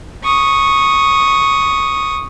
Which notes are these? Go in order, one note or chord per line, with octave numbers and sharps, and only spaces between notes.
C#6 D#6